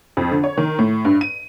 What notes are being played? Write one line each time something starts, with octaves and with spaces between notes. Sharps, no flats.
F2
D3
C#5
D#3
A2
G2
D#7